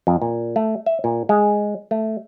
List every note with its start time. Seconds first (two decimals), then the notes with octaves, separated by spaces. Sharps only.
0.07 F2
0.22 A#2
0.56 A3
0.86 E5
1.04 A#2
1.29 G#3
1.91 A3